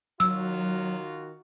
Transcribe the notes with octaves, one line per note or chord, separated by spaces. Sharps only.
D#3 F#3 F4 F#4 E6